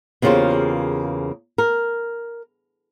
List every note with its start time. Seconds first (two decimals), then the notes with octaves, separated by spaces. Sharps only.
0.22 E2 C#3 A#3 F4 G4 C5
1.58 A#4